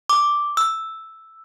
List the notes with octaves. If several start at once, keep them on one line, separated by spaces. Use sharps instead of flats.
D6
E6